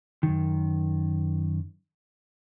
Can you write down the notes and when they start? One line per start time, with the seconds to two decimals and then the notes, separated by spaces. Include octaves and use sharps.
0.23 F#2 D#3